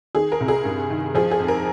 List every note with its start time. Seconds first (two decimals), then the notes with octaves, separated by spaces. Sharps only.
0.15 D#3 G#4
0.32 A#4
0.40 C2
0.48 G#4
0.65 G2
0.90 D#3
1.15 F3 G#4
1.31 G#4
1.40 F2
1.48 A#4